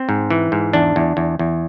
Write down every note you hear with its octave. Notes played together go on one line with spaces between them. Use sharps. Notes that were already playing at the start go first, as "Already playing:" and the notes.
Already playing: C4
G#2
E3
G#2
E2 D4
E2
E2
E2